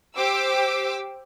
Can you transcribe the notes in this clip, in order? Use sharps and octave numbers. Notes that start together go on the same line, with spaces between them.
G4 C5 D6 E6